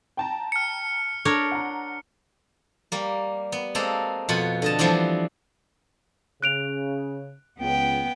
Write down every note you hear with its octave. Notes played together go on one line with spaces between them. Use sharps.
G5 A5 A#5
F6 C#7
D4 A4 A#4 C#5
F#5 A#5
G3 A#3
B3
G#3 A#3 C4 A4 A#4
F2 B2 F4 F#5 B5
D3 D#5 A5
E3 F3 G3 B3 C4 D4
C#3 F#6 D7 F7
C#2 B3 G5